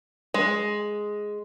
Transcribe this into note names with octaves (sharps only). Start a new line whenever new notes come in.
G#3